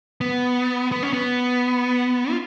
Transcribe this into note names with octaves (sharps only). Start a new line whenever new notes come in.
B3
B3
C#4
B3
F4